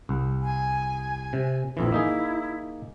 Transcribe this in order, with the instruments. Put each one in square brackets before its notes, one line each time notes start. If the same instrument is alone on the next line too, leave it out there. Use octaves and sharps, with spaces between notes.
[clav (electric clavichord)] C2
[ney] G#5
[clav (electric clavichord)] C3
[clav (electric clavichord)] A#1 F2 E3 [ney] E4
[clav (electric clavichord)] A#3 D#4 G#4